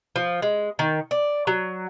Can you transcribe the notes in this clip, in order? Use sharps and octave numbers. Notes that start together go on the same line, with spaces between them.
F3
G#3
D#3
D5
F#3